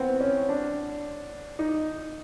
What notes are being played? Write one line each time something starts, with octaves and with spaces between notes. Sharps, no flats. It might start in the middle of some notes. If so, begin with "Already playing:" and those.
Already playing: B3 C4
C#4
D4
D#4